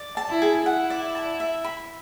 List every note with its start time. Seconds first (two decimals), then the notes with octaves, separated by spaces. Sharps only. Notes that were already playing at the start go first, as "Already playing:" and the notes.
Already playing: D5
0.17 A5
0.29 E4
0.42 G#4
0.66 E4 F#5
0.90 D5
1.15 A5
1.40 E5
1.64 B5